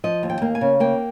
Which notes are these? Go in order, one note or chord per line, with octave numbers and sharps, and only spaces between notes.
F3 D#5
D#2
G5
A#3
G#5
C#3
A#3 G5